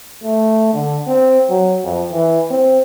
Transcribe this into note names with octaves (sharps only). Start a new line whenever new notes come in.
A3
D3
C4
F#3
F2
E3
C4